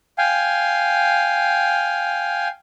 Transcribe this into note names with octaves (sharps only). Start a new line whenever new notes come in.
F5 G5 G#5